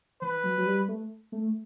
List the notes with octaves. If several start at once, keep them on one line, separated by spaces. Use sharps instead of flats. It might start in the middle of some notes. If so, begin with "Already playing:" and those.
E3 B4
F#3
F#3
G3
A3
A3